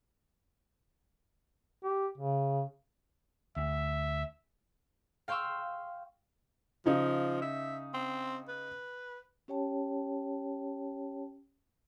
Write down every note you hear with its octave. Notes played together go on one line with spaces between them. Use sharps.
G4
C#3
D2 E5
F5 G5 C6 C#6 E6
C#3 F3 D#4
E5
C4
B4
C#4 G4 C#5 G5 A5